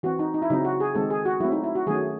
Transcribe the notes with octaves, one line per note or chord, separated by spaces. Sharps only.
E3 C4 F#4
D#4
D#4
E4
C#3 F#3 C4 D#4
F#4
G#4
D#3 G#3 C4 A4
G#4
F#4
F#3 A3 C4 E4
D#4
E4
F#4
D#3 F#3 A3 C#4 G#4